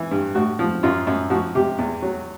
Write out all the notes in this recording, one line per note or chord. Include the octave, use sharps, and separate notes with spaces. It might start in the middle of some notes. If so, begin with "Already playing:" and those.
Already playing: E3
G2
A2 F#4
F3
F#2 F4
F#2
F3 F#4
C3 G4
E2
F#3